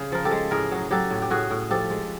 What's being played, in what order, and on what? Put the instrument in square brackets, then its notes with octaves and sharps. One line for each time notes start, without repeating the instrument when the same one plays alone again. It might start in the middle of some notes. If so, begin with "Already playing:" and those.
Already playing: [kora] C#3 G#4
F3 A#4
G4 A4
G#3
A2 G#4 A#4
F#3
F#3 G4 A4
A2
G4
A2 F#4 G#4
A2
F3 G4 A4
G#3